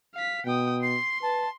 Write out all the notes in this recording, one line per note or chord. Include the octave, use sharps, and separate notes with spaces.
F5 B6
B2 G5 D#6
C6 C7
B4 A5